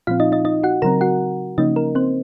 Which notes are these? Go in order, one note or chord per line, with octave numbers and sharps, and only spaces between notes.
A#2 F3 C4 F4 F5
D#4 D#5
D#4 D#5
D#4 D#5
F#4 F#5
C#3 F#3 C4 A#4 A#5
F#4 F#5
C#3 F3 A#3 C#4 D#4 D#5
A#4
C4 C5